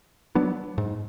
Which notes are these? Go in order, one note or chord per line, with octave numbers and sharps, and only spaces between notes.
F#3 B3 D4
G#2